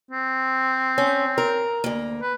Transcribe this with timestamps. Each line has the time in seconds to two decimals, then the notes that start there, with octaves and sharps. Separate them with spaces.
0.11 C4
0.98 C#4
1.38 A#4
1.84 D2 A#3
2.22 B4